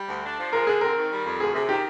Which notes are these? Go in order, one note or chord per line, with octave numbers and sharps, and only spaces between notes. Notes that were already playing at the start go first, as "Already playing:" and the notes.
Already playing: G3
D2
D4
F3
G#3 A#4
D3 G#4
C4 A#4
D#3
G3
F2
D2 G#4
C3 G#4
D#3 G4